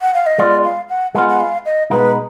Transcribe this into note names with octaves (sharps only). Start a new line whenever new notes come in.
F#5
F5
D#5
G#3 B3 F4 D5
F5
F#5
G#3 B3 F4 F#5
F#5
F5
D#5
B2 G#3 B3 D#4 B4